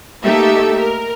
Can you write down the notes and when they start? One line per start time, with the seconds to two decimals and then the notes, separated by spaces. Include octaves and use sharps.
0.23 A3 A#3 D#4 G4 A4 E5
0.79 A#4